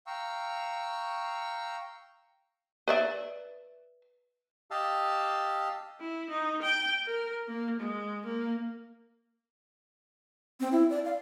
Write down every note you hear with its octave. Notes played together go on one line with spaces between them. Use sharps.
F5 G5 A#5 C#6 E6
B4 D5 E5
G4 D#5 F5 A5 E6
E4
D#4
G5
A#4
A#3
G#3
A#3
C4
E4
D5
F5